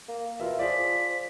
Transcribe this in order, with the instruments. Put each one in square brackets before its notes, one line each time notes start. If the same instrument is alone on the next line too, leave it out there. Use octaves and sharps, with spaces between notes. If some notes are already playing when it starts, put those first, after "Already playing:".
[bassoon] A#3
[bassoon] B2 [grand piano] F4 A#4 E5
[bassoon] F3 [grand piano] G#4 C5 D5 [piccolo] B6